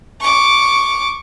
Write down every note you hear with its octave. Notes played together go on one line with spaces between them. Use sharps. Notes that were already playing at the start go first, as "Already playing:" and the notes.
C#6 D6